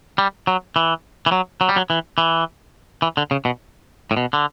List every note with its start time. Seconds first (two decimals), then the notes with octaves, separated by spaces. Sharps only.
0.18 G3
0.47 F#3
0.76 E3
1.26 E3
1.32 F#3
1.61 F#3
1.69 G3
1.76 F#3
1.90 E3
2.18 E3
3.02 E3
3.17 D3
3.31 C#3
3.45 B2
4.11 A2
4.17 B2
4.33 D3